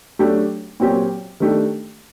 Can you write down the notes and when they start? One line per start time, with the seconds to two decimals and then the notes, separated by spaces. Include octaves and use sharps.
0.19 F#3 A3 D4 G4
0.80 A#2 F#3 C4 G4
1.40 D#3 A3 D4 G4